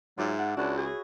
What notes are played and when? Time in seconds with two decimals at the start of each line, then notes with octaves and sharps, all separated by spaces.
0.18 G#2 F#3 F4 D5 E5
0.39 F#5
0.57 C#2 D4 F#4 B4 C#5
0.78 G#4